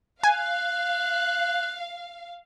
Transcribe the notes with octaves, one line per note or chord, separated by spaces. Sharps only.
F5 G#5 F#6